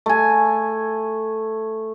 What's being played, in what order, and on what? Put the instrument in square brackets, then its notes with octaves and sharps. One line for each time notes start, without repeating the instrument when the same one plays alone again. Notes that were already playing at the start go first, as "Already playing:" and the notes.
[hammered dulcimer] A3 G#5